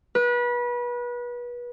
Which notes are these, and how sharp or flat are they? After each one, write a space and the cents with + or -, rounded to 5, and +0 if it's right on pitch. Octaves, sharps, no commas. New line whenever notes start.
B4 -30